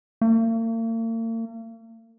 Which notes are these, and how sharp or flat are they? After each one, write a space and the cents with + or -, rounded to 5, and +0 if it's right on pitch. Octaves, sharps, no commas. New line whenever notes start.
A#3 -45